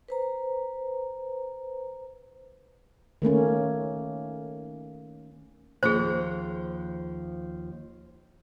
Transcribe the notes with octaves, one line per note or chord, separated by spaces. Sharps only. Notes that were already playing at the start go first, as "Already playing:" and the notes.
B4 C5 A#5
D#3 A3 A#3 C#4
D#2 F3 G#4 C5